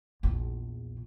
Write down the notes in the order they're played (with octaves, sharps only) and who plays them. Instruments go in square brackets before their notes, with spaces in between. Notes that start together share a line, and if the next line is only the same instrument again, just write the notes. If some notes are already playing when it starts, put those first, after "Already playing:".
[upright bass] A#1 E2